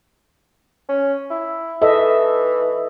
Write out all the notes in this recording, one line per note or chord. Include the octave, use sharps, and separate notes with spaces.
C#4
E4
E3 A4 D#5 E5